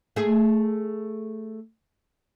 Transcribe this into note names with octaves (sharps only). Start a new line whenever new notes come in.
A3 G#4